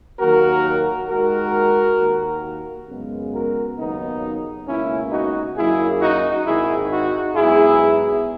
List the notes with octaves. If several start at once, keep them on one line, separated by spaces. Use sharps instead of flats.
D#2 D#3 F#3 A#3 F#4 A#4
D#2 D#3 G#3 F#4 A#4
D#2 D#3 A#3
F#2 C#3 G#3 B3
F#4 A#4
D#2 C#3 F#3 A#3 B3 D#4
C#2 B2 A#3 C#4 E4
D#4 F#4
F#2 D#3 F#3 A#3 E4 G#4
D#4 F#4
G#1 G#2 D#3 E4 G#4
D#4 F#4
G#2 F#3 B3 E4 G#4